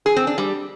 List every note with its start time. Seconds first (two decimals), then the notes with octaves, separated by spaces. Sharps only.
0.06 G#4
0.16 C4
0.27 D4
0.38 G3